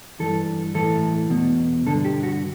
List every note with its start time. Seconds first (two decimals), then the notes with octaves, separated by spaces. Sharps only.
0.19 G2 E3 A4
0.75 A2 E3 A4
1.30 E2 B2
1.86 G2 D3 A4
2.05 G4
2.23 F#4